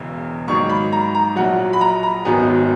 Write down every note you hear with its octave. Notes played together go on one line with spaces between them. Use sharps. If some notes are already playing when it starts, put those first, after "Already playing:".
Already playing: E1 E2 C#3
G#2 D#3 F#3 A#3 C#6
B5
A#5
A#5
A#1 A#2 F#3 F#5
B5
A#5
A#5
G#1 F#2 D#3 F#3 B3 G#5